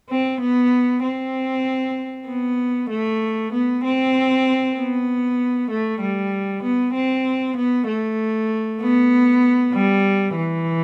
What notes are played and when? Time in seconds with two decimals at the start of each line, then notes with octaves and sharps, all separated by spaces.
0.10 C4
0.41 B3
1.03 C4
2.28 B3
2.90 A3
3.52 B3
3.84 C4
4.77 B3
5.70 A3
6.01 G3
6.63 B3
6.94 C4
7.56 B3
7.88 A3
8.81 B3
9.74 G3
10.36 E3